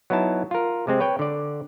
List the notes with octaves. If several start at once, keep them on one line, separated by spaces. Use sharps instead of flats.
F#3 B3 D#4 E4 A5
F4 A#4
C3 G#3 C4
B4 C#5 G5
D3 D5